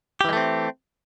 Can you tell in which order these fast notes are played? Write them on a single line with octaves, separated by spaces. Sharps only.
G4 E3 G#3 A3 C4